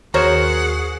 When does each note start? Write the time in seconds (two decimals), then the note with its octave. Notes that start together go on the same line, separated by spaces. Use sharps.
0.14 D#2 F#4 G#4 A#4 C5 C#5 F#5 A#5